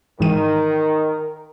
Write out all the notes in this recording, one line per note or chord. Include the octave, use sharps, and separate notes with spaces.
G#2 D#3 E3 A#4 D#7